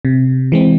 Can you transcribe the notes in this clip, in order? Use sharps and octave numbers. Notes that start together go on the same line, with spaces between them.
C3
E3 G#3 C4